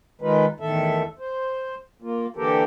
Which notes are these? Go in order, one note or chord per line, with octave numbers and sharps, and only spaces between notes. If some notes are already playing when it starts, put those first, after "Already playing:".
D#3 G#3 D#4 F4 B4
E2 A2 D#3 A4 E5
C5
A#3 F4
D3 E3 A#3 G4 A4 A#4